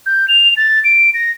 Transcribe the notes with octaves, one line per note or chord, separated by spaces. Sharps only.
G6
F7
A6
D7
A#6